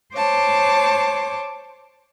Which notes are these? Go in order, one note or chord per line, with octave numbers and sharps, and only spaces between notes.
C5 C#5 A5 D6